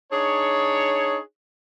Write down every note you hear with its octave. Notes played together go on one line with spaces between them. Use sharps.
D4 D#4 G#4 C#5